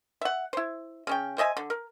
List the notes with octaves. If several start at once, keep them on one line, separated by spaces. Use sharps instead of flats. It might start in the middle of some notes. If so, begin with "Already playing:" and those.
E5 F#5
E4 C5
C#3 C#4 G5
C5 D#5 E5 G#5
D3
A#4